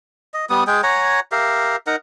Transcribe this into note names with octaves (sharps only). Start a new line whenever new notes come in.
D#5
G3 B3 D#6
G#3 G#4 G5
C#5 F#5 G#5 A#5
G4 A#4 E5 F5
D#4 A#4 F#5